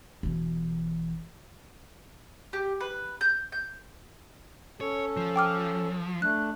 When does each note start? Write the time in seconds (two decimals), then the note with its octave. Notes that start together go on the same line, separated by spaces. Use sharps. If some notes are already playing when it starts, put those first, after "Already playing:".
0.23 E1 E3
2.53 G4
2.80 B4
3.21 G6
3.52 G6
4.81 C#4 A4 C#5
5.17 F3
5.36 G5 D6 F6
6.22 A3 D4 F#6